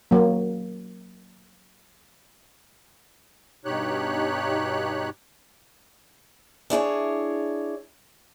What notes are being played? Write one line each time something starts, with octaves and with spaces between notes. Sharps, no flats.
F#3 A#3
G2 B2 D#4 G4 C#5 F#6
D4 E4 G#4 C#5